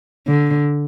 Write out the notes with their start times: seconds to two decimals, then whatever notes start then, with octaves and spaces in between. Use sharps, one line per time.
0.27 D3